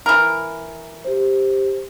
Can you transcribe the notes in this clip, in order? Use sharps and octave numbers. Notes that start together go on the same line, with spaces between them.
E3 A#4
G4 C5